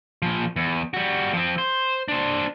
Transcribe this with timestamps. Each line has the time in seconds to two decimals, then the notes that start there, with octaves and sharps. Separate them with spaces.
0.22 A#2 F3
0.56 E2
0.94 G3 F#4
1.33 F3 C4
1.58 C5
2.08 D4 C5